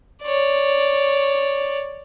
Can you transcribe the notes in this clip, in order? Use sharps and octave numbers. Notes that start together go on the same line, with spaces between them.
C#5 D5